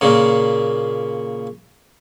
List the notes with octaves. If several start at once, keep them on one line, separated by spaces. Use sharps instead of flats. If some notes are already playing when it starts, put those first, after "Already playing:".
A#2 C#3